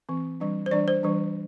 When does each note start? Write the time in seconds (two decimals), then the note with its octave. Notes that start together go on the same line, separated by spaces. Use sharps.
0.09 E3 C4
0.40 E3 G3 D4
0.66 C5
0.71 E3 G3 D4 D5
0.88 C5
1.03 E3 G3 D4